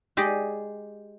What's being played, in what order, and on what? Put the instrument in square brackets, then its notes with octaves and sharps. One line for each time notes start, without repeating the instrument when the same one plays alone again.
[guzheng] G#3 G4 D5 D#5